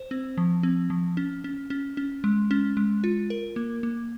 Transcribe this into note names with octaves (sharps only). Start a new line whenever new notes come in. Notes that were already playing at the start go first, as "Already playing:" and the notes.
Already playing: C5
C4
F3
C4
F3
C#4
C#4
C#4
C#4
G#3
C#4
G#3
F4
A#4
A#3
A#3